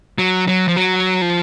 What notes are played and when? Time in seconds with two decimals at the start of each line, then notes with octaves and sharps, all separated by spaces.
0.18 F#3
0.48 F#3
0.68 F3
0.76 F#3
1.22 F3